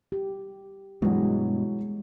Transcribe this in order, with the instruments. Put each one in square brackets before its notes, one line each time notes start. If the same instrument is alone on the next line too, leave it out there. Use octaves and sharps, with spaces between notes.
[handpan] G4
[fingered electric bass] G2 B2 [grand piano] E3 F#3 [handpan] G#3